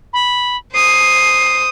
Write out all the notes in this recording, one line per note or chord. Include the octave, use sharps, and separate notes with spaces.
B5
C5 D#6 C7